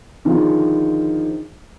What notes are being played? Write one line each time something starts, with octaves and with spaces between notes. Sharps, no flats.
D3 D#3 F3 F4 G#4